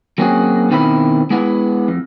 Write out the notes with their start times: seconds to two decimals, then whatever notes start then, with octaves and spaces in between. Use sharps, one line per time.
0.18 F#3 A#3 C4 C#4 F#4 G#4
0.70 B2 D#3 C4 E4 E5 B5
1.30 G#3 B3 E4 F#5
1.88 F2